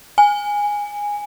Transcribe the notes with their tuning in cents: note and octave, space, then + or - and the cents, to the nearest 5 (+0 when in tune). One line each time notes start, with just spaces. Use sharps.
G#5 -10